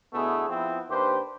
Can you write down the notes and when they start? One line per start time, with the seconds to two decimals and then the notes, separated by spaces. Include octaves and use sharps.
0.14 B2 D3 A3 B3 E4 G#4
0.49 F3 B3 C4 E4
0.89 D#2 D4 G4 B4 C5